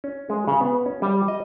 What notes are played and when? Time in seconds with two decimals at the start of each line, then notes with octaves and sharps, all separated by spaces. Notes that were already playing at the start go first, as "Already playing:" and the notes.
0.04 C#4
0.30 G#3
0.47 C#3
0.61 B3
0.86 C#4
1.02 G3
1.28 D#5